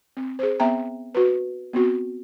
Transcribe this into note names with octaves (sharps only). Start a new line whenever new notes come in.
C4
G#4 C5
B3 C4 E5 G5 A#5
F#4 B4
B3 C4 F#4